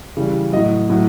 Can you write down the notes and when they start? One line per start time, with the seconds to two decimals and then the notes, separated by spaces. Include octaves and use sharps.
0.17 C#3 E3 G3
0.52 A2 F#3 D#5
0.90 A2 F#3